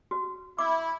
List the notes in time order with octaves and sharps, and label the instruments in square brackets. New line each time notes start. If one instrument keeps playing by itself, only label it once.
[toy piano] F#4
[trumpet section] E4 [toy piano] D6